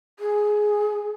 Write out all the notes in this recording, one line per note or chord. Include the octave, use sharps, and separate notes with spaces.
G#4